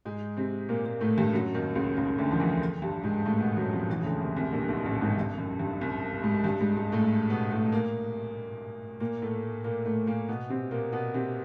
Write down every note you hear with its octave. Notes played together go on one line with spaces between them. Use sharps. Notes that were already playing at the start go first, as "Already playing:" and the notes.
G#2 G#3
C3 C4
A#2 A#3
A#2 A#3
A2 A3
G2 G3
F#2 F#3
D#2 D#3
C#2 C#3
C#2 C#3
D2 D3
F3
E2 E3
G2 G3
G#2 G#3
A2 A3
B2 B3
F#2 F#3
F2 F3
E2 E3
C#3
D2 D3
C2 C3
C2 C3
A#1 A#2
B1 B2
A1 A2
G#1 G#2
G2
F#2
G2
C2 C3
G#2 G#3
G2 G3
G#2 G#3
G#2 G#3
A2 A3
B2 B3
A2 A3
A#2 A#3
A#2 A#3
A2 A3
A#2 A#3
A2 A3
A#2 A#3
B2 B3
C3 C4
A#2 A#3
B2 B3
C3 C4